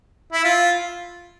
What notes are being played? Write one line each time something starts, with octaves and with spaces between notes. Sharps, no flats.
E4
F4